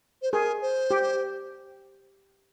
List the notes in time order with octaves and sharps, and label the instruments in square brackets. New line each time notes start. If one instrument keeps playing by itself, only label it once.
[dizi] C5
[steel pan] G#4 [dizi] A#4
[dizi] C5
[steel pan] G4